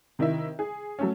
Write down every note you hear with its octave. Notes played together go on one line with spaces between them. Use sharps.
C3 D#3 E4 D#5 E5
G#4
F#3 A3 C#4